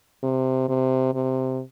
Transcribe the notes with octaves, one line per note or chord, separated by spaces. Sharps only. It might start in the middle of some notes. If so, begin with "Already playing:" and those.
C3
C3
C3